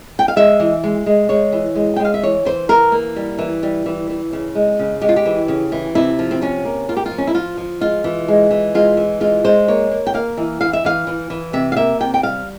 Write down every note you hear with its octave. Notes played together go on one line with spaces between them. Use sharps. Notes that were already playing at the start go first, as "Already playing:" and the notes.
G5
F5
G#3 E5
E3
G#3
G#3
G#3 C#5
E3
G#3
G5
G#3
F5
E5
E3 C#5
E3 C5
E3 A#4
A#3
G3
E3
G3
E3
E3
C#3
G#3
C#3
G#3 G4
F4
G4
E3
C#3
E3
C3 E4
F3
C4
C3 C#4
A#3
A#3 F4
G4
F4
F3
C#4
E4
F3 F4
F3
G#3 F4
E3
G#3
E3
G#3 F4
E3
G#3 F4
G#3 C5
A#3 C#5
A#3
G5
A#3 F5
E3
E3 F5
E5
E3 F5
E3
E3
C3 E5
F5
A#3 E5
C3 G5
G5
G3 F5